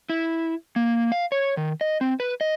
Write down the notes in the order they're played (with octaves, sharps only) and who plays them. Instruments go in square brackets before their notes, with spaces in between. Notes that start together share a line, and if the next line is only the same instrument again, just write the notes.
[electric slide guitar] E4
A#3
F5
C#5
D#3
D#5
C4
B4
D#5